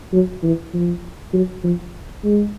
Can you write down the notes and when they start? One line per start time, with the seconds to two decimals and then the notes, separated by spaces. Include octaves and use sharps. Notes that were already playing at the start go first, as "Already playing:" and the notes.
0.13 F#3
0.43 E3
0.74 F3
1.33 F#3
1.64 F3
2.24 G#3